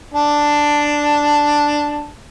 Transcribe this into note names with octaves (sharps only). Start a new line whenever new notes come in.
D4 A5